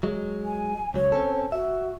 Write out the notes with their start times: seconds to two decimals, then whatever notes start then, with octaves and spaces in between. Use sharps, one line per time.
0.03 F#3 G#3
0.45 G#5
0.94 C#2 F#3 C#5
1.12 C4 C#4 A4
1.52 F#4 E5